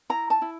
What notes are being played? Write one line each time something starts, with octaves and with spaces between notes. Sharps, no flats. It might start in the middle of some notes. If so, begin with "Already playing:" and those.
E4 A#5
A5
E4